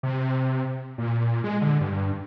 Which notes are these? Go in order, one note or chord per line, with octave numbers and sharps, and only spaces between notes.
C3
A#2
G#3
D3
G2